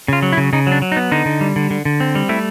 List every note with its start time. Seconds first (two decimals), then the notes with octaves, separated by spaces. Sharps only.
0.08 C#3 F4
0.22 F#3
0.33 E4
0.37 C#3
0.53 C#3 D#4
0.67 F#3 D4
0.82 F#3
0.92 D#4
0.96 B3
1.12 D3 D#4
1.25 D3
1.41 G3
1.56 D3
1.71 D3
1.85 D3
2.00 C4
2.15 G3
2.29 A3 E4